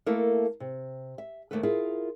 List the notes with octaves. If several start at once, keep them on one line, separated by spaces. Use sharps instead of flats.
A3 A#3 E4 A4 A#4
C3
E5
D#2 E3 A3 A#3 A4 B4
E4 F4 G#4 A#4